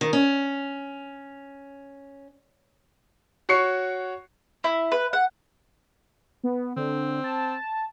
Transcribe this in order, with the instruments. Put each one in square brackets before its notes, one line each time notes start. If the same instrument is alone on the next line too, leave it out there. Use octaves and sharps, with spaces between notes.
[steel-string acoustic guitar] D#3
C#4
[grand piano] F#4 C#5 C7 C#7
[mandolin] E4
B4
F#5
[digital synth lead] B3
[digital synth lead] D3 [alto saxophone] C4
[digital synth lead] A5